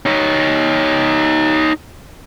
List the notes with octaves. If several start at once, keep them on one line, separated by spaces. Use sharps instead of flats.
D#4 C#5